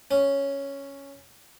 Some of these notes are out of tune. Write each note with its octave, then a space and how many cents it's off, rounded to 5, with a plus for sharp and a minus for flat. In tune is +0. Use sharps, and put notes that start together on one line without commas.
C#4 +0